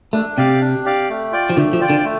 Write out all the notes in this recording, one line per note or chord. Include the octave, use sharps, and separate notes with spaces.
A3 D4
C3 G4 D5 F5
D4
G4 D5 F5
A3
F4 D5 G5
F3
D3 A3
F3
F4 D5 G5
D3
A3